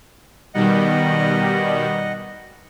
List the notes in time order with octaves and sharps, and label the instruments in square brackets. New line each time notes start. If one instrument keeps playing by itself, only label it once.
[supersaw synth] B2 D#3 G3 [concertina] D#5 F#5